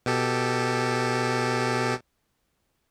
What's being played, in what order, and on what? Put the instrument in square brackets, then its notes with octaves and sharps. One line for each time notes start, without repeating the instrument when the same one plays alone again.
[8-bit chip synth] B2 G4 A4